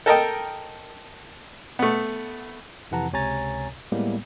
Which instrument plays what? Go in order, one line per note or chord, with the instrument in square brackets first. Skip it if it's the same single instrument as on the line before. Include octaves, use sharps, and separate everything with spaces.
[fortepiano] A4 A#4 D#5 G5
A3 B3
[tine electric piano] F2 C3 E3 F#5 A5 A#5
C#2 C3 C#5 G#5 A#5 A6
A2 G3 G#3 A#3 B3